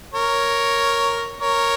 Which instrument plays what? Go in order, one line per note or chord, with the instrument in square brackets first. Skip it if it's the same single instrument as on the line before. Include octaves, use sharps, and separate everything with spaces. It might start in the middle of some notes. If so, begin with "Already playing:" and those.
[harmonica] A#4 C#5
A#4 C#5